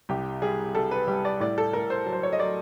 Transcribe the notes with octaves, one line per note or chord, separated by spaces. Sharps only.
C2 G4
G3 G#4
G3 A4
B4
G3
D5
A2 D5
A4
A2 A#4
C5
F#3
C5
C#5
D#5
F#3 D5